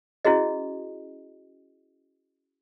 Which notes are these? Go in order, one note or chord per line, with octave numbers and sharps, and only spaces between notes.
C#4 E4 F#4 G#4 D#5